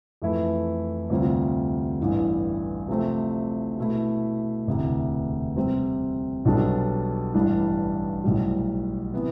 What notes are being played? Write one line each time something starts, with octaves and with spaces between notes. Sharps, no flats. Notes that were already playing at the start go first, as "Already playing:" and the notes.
F2 E3 A3 E4 B4
D2 C3 G3 C4 F4
A1 G2 E3
C3 F3 A3 C4
B2 A3 E4
E1 D2 C3 E3
C3 G3 C4
B1 B2 G3 D4 A4
A1 G2 E3 G3 D4
B1 A2 G3
C3 E3 B3